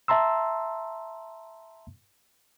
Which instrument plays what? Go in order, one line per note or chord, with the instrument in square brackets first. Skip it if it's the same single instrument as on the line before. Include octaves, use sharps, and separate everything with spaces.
[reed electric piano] E5 A5 A#5 C6 E6